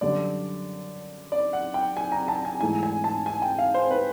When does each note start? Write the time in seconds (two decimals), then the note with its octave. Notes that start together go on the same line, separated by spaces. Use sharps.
0.01 F#2 D3 G3 D5
1.32 D5
1.53 F#5
1.74 G5
1.97 G#5
2.12 A#5
2.28 A5
2.45 G#5
2.61 G#2 E3 A3 G#5
2.83 G#5
3.04 A5
3.26 G#5
3.42 G5
3.59 F5
3.74 C5
3.91 B4